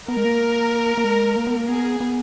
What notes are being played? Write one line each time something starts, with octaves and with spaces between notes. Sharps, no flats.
B3 A#4
G#3
A#3
A#3
G#3
A#3
B3
A#3
B3 G#4
B3